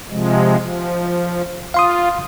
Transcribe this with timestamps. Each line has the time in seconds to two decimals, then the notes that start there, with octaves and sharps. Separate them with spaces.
0.11 C3 F3 G#3
0.59 F3
1.74 F4 F5 C6 D#6